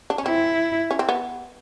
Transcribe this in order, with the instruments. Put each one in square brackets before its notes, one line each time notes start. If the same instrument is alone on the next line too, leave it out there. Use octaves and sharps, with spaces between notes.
[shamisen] D4
C#4
[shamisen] C4 [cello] E4
[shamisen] C#4
C4
B3